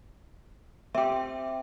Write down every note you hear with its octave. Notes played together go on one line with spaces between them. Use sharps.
C4 G4 E5 G5